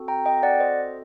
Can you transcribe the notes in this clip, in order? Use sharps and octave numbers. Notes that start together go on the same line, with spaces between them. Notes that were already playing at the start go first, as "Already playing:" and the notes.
Already playing: C4 F#4 A4
G5 A#5
D#5 G5
D5 F#5
C5 D#5